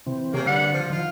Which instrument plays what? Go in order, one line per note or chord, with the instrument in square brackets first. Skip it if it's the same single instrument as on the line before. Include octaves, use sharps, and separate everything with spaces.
[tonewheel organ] C3 E3 C4
[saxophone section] C3 A#3 [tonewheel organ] G4 G#4 C#5
[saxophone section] G2 G3 F#5 [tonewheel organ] D3
[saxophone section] F3
[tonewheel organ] D#3 F3 [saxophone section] F4